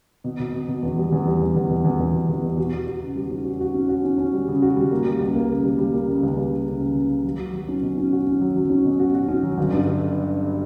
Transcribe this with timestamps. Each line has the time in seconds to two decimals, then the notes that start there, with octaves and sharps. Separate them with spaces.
0.24 B2
0.39 B2
0.53 B2
0.68 B2
0.83 E2
0.97 G3
1.12 E2
1.27 G3
1.41 E2
1.56 E2
1.70 B2
1.84 E2
2.00 E2
2.14 B2
2.29 E2
2.43 B2
2.58 F#4
2.72 F#4
2.87 F#4
3.02 C#3
3.16 G3
3.30 C#4
3.45 F#4
3.61 F#4
3.74 C#4
3.89 F#4
4.04 C#4
4.18 C#4
4.33 G3
4.48 C#3
4.62 F#4
4.76 G3
4.91 A#3
5.06 G3
5.20 C#2
5.35 A#3
5.49 C#3
5.64 G3
5.78 G3
5.93 A#3
6.07 C#3
6.23 C#2
6.37 G3
6.52 C#3
6.66 C#3
6.81 C#2
6.95 C#3
7.10 C#3
7.24 F#3
7.39 F#4
7.53 F#3
7.68 C#4
7.83 B2
7.97 C#4
8.12 F#4
8.26 C#4
8.41 F#3
8.56 F#3
8.70 C#4
8.85 B2
8.99 F#4
9.14 F#4
9.28 C#4
9.43 F#3
9.58 G1
9.73 G2
9.87 D3